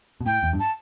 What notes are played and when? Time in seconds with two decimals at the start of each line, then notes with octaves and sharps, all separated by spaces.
0.21 B2
0.26 A2 G5
0.43 E2
0.53 G2
0.59 A5